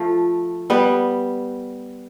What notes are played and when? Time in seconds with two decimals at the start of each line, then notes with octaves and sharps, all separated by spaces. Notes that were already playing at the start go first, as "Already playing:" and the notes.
Already playing: F3 A3
0.70 G3 B3